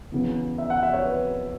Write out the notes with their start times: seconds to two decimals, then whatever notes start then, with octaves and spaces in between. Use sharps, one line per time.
0.12 C#3 E3 B3
0.58 E5
0.70 F#5
0.83 E5
0.93 C#5
1.05 B4